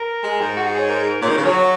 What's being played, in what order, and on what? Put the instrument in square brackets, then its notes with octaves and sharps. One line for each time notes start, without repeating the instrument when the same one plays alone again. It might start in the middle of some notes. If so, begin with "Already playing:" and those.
Already playing: [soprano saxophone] A#4
[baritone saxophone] G#3
G#2
[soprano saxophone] F#4
G#4
C#5
A#4
[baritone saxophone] A#2 [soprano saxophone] C#5
[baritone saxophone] D#3 [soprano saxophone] A#4
[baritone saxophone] C#3
[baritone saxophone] F#3 [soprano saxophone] C#5
[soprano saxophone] F#4